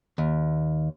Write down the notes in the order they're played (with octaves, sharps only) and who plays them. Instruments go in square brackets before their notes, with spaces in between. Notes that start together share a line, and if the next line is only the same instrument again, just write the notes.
[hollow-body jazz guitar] D#2